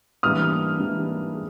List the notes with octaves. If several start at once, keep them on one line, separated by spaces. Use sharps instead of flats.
G#2 E3 G3 A#3 D4 D#6 F6
G#2 E3 G3 A#3 D4
G#3